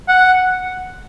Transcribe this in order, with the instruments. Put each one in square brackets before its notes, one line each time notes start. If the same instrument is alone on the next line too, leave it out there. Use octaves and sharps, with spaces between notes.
[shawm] F#5